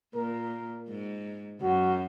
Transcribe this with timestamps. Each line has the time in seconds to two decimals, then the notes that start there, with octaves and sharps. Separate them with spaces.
0.15 A#2 A#4
0.88 G#2
1.62 F#2 F#4